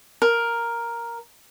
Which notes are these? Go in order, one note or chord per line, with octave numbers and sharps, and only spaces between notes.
A#4